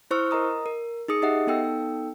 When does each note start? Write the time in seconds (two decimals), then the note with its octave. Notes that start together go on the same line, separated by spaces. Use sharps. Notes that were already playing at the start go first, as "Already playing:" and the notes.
0.11 E4 C5 C#6 E6 F6
0.31 A#4 D#5 A#5 D#6
0.66 A#4
1.08 D#4 G#4 D#6 C#7
1.22 D#4 G4 D#5 E5 F#5
1.47 B3 D#4 A4 G5 E6